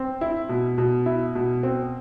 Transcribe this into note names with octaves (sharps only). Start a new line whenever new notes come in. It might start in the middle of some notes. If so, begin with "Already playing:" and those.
Already playing: C4
E4
B2
B2
E4
B2
C4